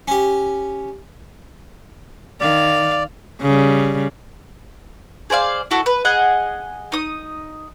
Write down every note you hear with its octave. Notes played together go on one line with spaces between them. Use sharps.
C#4 G4
D#3 D5 F5
C#3 G3
G#4 C5 D5 F5
E4 F#4 A4
B4
G#4 D#5 F#5
D#4 D#6